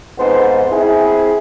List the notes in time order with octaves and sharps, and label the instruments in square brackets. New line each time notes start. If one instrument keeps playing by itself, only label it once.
[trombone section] F2 G#2 B3 C5
C4 E4 G#4